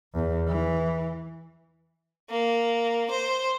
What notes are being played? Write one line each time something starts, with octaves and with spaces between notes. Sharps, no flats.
E2
E3
A#3
C5